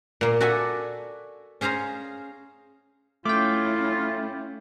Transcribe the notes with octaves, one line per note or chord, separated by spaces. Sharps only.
A#2 A#3
F#4 A4 D5 E5 G#5
C#4 G#4 C5 F5 A#5
A3 C#4 E4 F4 G5 D6